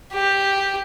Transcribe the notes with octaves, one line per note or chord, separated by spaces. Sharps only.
G4